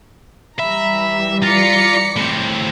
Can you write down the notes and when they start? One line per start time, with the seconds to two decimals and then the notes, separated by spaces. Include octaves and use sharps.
0.59 E3 G3 E5 A#5 B5
1.43 F4 D5 A#5 B6 C#7
2.17 A2 C4